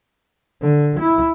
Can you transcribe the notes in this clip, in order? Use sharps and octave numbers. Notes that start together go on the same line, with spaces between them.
D3
E4